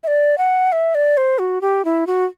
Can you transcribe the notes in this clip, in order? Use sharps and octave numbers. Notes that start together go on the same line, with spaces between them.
E5
D5
F#5
E5
D5
C5
F#4
G4
E4
F#4